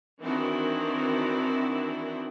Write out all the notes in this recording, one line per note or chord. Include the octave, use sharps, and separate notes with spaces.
D#3 E3 C4 D4 E4 F#4